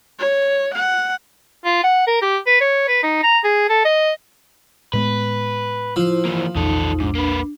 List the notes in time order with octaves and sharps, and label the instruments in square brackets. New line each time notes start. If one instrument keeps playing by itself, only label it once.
[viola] C#5
F#5
[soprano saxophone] F4
F#5
A#4
G4
B4
C#5
B4
D#4
A#5
G#4
A4
D#5
[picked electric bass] A2 G#3 B3 [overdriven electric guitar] B4
[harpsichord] F3 [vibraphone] E4 C5
[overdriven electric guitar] E3 A#3
[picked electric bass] A#1 E2 [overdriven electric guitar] D#3 A4 [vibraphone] D#4
[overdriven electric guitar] G#2 [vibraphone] D4
[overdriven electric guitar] A#3 B4